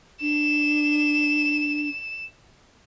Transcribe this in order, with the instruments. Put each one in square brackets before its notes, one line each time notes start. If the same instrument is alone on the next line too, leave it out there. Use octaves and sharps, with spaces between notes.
[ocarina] D4 [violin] E7